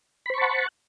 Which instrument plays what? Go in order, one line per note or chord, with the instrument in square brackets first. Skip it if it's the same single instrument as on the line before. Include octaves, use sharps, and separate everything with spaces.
[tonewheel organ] B5
C5
C#6
A5
F#5